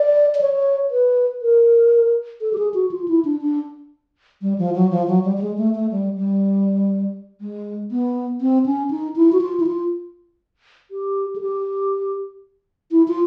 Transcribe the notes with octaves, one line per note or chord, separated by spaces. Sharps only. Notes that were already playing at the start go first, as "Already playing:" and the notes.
Already playing: D5
D5
C#5
B4
A#4
A4
G4
G#4
F#4
F4
E4
D4
D4
G3
F3
F#3
F3
F#3
G3
G3
G#3
A3
A3
G3
G3
G#3
B3
C4
C#4
D#4
E4
F#4
F4
E4
F4
G4
G#4
G4
E4
F4